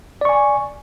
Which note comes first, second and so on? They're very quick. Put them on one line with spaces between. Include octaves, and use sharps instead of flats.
D5 C#6 G#5